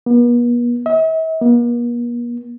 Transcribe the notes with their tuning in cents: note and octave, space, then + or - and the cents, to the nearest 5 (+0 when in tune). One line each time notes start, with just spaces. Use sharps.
B3 -45
E5 -45
A#3 +45